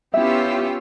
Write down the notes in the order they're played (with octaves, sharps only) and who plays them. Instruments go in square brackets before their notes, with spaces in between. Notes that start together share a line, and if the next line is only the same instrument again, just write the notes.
[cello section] B3 C#4 F4 [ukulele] E4 E5 [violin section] G4 E6